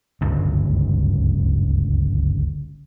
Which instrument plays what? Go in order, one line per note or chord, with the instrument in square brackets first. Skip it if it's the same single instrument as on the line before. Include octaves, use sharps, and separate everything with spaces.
[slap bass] D1 G1 C#2 F#2